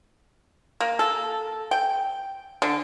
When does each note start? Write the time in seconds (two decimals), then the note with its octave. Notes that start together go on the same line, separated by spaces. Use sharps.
0.80 A#3
0.99 A4
1.71 G5
2.62 D3